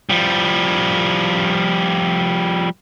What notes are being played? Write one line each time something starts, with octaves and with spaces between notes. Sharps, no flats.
F3 G3